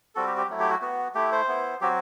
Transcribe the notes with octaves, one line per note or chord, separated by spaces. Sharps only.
G3 C4 F#4 A4
G4
G4
F#3 A3 E4
G4
F#4
B3 F#4
A3 E4 G4
C5
B3 E4
F#3 C4 F#4 G4